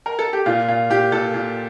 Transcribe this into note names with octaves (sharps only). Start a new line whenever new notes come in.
A#4
A4
G4
A#2 F4
A#2 F4
A#2 G4
A#2 A4
A#2